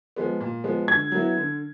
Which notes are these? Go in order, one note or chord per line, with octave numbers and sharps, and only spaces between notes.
F3 G#3 B3
A#2
F3 G#3 B3
D3 G#6
F#3 B3 E4
D3